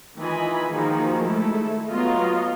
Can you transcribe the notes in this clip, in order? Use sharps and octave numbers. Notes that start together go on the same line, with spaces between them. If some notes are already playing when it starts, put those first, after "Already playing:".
D#3 E3 F4 D#5 G#5 B5
D#3 F3 A#3 F#4 G#4
G#3 A3 E4 A4
F#3 B3 F4 D#5 F5